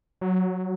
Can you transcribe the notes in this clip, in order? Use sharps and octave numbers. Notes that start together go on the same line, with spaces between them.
F#3